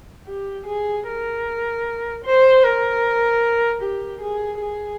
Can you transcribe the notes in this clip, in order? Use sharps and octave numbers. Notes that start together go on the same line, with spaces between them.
G4
G#4
A#4
C5
A#4
G4
G#4
G#4